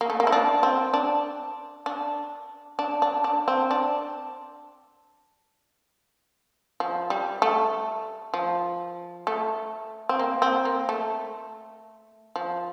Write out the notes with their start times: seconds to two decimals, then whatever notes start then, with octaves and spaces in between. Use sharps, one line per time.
0.01 A#3
0.10 A3
0.20 A#3
0.27 E4
0.32 D4
0.63 C4
0.94 D4
1.86 D4
2.79 D4
3.02 D4
3.24 D4
3.48 C4
3.71 D4
6.80 F3
7.10 G3
7.42 A3
8.34 F3
9.27 A3
10.09 C4
10.19 A#3
10.42 C4
10.65 A#3
10.89 A3
12.36 F3